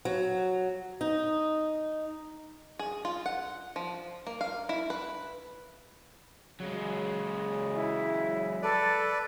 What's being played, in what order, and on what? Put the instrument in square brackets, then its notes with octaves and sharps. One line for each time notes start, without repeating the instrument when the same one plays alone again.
[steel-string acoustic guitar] F#3
D#4
[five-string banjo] G#4
F4
F#5
F3
A#3
F5
E4
B4
[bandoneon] C#3 [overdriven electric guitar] F#3 G#3
[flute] E4
[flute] A4 [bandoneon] B4 D5